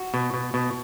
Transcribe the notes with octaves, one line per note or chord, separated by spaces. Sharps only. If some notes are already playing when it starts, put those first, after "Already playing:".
Already playing: F#4
B2
B2
B2